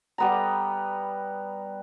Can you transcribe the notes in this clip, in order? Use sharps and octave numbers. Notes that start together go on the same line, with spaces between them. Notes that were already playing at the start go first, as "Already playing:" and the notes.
G3 B3 A#5